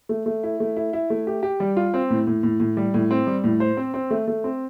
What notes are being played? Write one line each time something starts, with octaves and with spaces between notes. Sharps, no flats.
A3
A3
E4
A3
E4
E4
A3
G4
G4
G3
F4
C4
A2
A2
A2
A2
G3
A2
C4
G3
A2
C5
C4
C4
A3
A3
C4